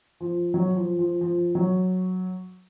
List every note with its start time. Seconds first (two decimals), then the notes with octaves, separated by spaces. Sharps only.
0.20 F3
0.54 F#3
0.76 F3
0.99 F3
1.21 F3
1.55 F#3